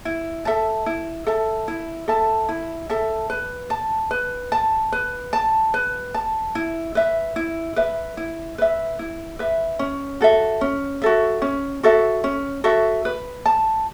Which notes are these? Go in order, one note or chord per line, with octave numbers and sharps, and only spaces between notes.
E4
A4 E5 A5
E4
A4 E5 A5
E4
A4 E5 A5
E4
A4 E5 A5
B4
A5
B4
A5
B4
A5
B4
A5
E4
B4 E5
E4
B4 E5
E4
B4 E5
E4
B4 E5
C#4
F#4 A4 E5
C#4
F#4 A4 E5
C#4
F#4 A4 E5
C#4
F#4 A4 E5
B4
A5